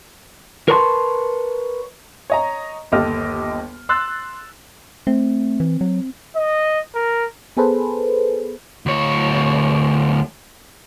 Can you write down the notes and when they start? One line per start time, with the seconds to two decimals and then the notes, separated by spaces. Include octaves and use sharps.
0.68 A#4 B4 C#5 A5 A#5 C6
2.30 C#5 D#5 A#5
2.92 G1 D#2 G4 A4 D#5 F6
3.89 C6 E6 F#6 A6
5.07 A3 C4
5.60 E3
5.81 F#3
6.35 D#5
6.95 A#4
7.57 B3 G#4 A4 B4 C5
8.86 D2 C#5